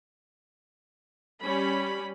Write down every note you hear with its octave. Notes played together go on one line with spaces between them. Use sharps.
G3 C#4 B5